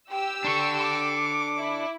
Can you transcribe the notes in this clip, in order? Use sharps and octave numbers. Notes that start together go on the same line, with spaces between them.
G4 G5 E6
D4 A4 C#6
D6
E4